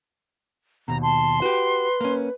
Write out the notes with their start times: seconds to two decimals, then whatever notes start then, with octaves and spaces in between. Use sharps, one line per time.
0.88 D#2 B2 A#5
1.03 A5 C6
1.42 F#4 G4 B4
2.01 A#3 C#4